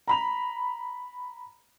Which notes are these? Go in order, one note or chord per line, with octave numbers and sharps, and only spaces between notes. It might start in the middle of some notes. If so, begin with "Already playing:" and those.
A#5 B5 F7